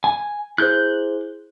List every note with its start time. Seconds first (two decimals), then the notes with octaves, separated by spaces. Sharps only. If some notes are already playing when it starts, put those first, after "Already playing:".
0.04 G#5
0.58 E4 G#4 C5 F#6 G6